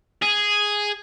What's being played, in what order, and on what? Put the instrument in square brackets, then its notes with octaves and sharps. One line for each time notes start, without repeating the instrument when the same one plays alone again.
[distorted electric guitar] G#4